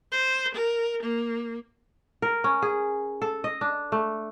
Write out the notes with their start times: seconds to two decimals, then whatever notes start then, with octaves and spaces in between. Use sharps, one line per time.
0.12 C5
0.55 A#4
1.03 A#3
2.22 A#4
2.44 C#4
2.62 G#4
3.22 A4
3.44 D#5
3.61 D4
3.92 A3